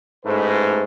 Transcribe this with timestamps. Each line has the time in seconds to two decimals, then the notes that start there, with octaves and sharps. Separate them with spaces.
0.24 A1 G#2 A3 B4